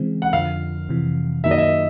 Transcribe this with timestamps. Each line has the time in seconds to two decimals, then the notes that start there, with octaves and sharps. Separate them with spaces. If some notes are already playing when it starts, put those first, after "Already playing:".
Already playing: C#3 E3 G#3 C4
0.22 F#5
0.33 F2 D3 F3 F5
0.89 F2 C3 E3
1.44 F#2 D#3 F#3 A#3 D#4 E5
1.51 D#5
1.58 E5